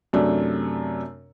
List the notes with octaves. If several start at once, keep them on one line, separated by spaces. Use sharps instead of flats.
F#2 C3 A3 D4